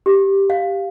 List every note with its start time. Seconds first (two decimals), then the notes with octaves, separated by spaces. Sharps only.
0.06 G4
0.50 F5